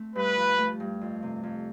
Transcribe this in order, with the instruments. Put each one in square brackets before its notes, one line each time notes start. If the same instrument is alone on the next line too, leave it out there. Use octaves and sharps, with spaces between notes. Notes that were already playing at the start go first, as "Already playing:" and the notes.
Already playing: [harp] A3 C4
[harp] G2 [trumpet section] B4
[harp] F3
A3
G2
F2
C3
F2